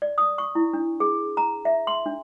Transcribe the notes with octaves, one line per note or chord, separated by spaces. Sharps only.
D5
D#6
C#6
E4
D4
G#4
A#5
E5
C6
D4